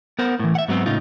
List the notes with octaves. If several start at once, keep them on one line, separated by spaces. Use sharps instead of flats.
B3 A#4 C5 F#5
A2 E3
E5 F#5
G#2 F#3 B3 C4
A2 C#3 D#4 F4